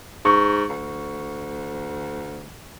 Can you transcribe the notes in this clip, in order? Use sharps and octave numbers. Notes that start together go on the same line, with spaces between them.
G#2 C#6
D2